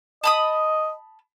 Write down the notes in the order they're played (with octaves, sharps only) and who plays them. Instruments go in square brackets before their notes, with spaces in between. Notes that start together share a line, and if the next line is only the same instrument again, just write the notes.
[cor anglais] D#5 [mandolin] A5 B5 D#6